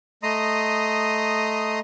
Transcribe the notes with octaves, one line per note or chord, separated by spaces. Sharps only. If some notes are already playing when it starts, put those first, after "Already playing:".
A3 D#5 A#5 C6 D#6